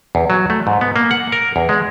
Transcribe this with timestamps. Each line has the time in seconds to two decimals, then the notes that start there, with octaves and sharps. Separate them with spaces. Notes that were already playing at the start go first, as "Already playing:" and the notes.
0.15 E2
0.30 F#3
0.50 A3
0.67 G#2
0.81 B3
0.96 A#3
1.11 F#5
1.32 A#4
1.56 E2
1.69 G#3